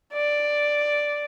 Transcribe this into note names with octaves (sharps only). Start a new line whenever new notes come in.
D5